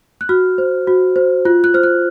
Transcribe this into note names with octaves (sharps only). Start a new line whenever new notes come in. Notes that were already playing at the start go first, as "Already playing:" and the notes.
F#6
F#4 F6
C5
F#4
C5
F4 F#6
F#6
C5 F6
F#6